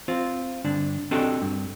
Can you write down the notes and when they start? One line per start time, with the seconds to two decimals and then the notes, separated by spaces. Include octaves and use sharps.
0.08 C4 F4 C5
0.65 G2 D3 D4
1.11 C4 D4 F#4 G4 A4 D#5
1.42 G2